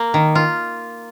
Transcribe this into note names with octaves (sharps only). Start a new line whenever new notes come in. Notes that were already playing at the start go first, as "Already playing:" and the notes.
Already playing: A#3
D#3
F4